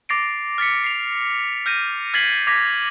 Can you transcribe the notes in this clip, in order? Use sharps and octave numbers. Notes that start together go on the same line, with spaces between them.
D6 A6 A#6 C7 D7
F6 A6 B6 C#7
C7 F7
F6 G6 A#6 D#7
F6 G#6 A6 B6 C7 F#7
D6 G#6 A#6 B6